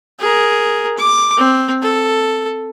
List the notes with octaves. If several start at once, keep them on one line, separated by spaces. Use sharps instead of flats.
G#4 A#4
D6
C4
A4